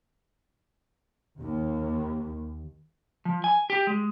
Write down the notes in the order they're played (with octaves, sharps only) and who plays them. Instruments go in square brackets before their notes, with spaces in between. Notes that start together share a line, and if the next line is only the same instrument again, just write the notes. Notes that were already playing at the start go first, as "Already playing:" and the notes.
[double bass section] D#2
[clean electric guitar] F3
G#5
G4
G#3